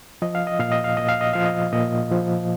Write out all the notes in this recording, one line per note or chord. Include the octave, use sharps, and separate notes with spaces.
F3 D#5
F5
D#5
A#2 F5
D#5
F5
A#2 D#5
F5
D#5
F3 F5
D#5
A#2 D#5
F3